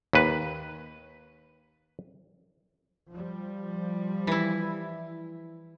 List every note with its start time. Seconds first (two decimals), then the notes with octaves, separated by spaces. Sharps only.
0.13 D#2 B4
3.11 F3 G3
4.27 E3 E4